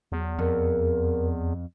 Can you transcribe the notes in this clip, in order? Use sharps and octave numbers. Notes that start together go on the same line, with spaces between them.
E2 F#3
F2 A#4